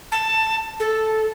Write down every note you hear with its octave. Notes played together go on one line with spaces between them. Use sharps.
A5
A4